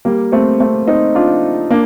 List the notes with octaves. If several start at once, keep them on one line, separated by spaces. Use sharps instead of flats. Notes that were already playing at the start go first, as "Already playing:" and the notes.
G3 A#3
A3 C4
A3 C4
C4 D#4
D4 F4
A#3 D4